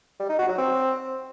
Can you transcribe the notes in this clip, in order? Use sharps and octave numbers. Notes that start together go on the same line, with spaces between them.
G3
D#4
F#4
F#3
C4